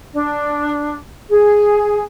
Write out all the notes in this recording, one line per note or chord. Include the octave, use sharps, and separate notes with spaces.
D4
G#4